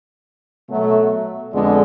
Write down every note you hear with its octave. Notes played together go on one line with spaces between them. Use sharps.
B2 F#3 A3
F2 D3 G#3 B3 D4